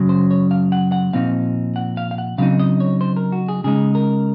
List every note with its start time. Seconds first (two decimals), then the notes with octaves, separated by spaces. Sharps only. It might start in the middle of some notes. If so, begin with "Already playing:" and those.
Already playing: F#2 C#3 F#3
0.09 C5
0.31 C#5
0.51 F5
0.72 F#5
0.92 F#5
1.13 A#2 F3 C4 D#4 F5
1.76 F#5
1.97 F5
2.11 F5
2.18 F#5
2.38 C#3 F#3 C4 D#4 F5
2.60 D#5
2.80 C#5
3.01 C5
3.16 A#4
3.32 F#4
3.49 G#4
3.64 C#3 G#3 D#4 G#4
3.95 A#4